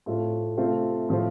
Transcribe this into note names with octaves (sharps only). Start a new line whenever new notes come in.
A2 A3 C4 F4
C3 A3 C4 F4
A2 F3 C4 F4